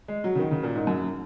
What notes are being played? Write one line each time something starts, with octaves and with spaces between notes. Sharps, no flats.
G#3
F#3
C#3
D#3
C#3
A#2
G#2
F#2